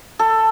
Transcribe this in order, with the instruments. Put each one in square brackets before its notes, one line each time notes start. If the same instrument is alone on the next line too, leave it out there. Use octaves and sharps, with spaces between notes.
[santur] A4